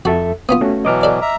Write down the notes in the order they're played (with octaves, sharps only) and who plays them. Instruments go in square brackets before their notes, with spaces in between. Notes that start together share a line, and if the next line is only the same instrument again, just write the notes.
[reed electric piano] F2 A4 E5 [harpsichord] F#4
[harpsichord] A#3 B3 F4 [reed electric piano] D#6
[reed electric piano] A3 C#4 F#4
[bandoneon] B2 E3 F#3 [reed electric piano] D#5 D6 F6
[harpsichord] A4 D5
[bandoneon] E5 A#5